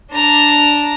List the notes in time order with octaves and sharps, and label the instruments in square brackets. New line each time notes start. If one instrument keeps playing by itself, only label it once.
[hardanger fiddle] D4 A#5